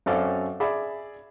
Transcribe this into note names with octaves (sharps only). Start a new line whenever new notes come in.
F#2 C4 C#4 A4 D5 F5
G#4 D5 E5 B5